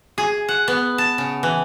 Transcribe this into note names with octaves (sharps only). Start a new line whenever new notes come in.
G#4
F#5
B3
A5
C#3
E3